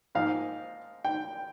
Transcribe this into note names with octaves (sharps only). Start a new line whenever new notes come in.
G#2 F3 A#3 D#4 F5
G5